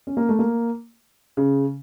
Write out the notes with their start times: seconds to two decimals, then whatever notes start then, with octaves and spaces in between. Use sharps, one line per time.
0.07 C#4
0.17 A#3
0.29 A3
0.39 A#3
1.37 C#3